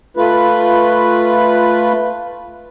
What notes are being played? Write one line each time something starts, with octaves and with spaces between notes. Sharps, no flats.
A3 F4 B4